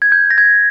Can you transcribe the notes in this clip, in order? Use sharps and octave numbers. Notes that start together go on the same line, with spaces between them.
G#6
G6
A#6
G#6